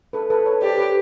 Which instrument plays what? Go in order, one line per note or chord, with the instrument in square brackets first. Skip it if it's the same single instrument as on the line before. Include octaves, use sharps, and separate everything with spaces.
[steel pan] A4 B4
A4 B4
B4 C#5
[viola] G4 [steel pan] C5 D5
[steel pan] B4 C#5